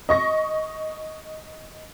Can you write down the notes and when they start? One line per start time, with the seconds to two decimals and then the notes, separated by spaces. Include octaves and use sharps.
0.09 D#5 C#6 A#6